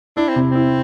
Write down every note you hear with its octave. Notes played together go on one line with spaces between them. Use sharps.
D4 E4
C4
C3
C4 E4